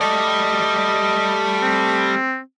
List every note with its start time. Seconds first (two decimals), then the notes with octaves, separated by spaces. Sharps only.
0.01 G3 A3 D5 D#5
1.62 C4